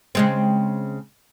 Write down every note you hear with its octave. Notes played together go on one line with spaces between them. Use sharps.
C#3 G#3 C4